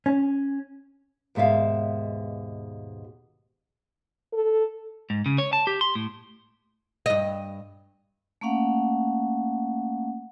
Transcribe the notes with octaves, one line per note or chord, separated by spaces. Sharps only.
C#4
D#2 G#2 B2 E5 F5
A4
G#2
C#3
C#5
A5
G4
C6
A2
G2 D#5
A3 A#3 C#4 F5 F#5